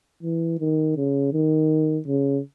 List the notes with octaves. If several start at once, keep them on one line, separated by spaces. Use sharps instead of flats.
E3
D#3
C#3
D#3
C#3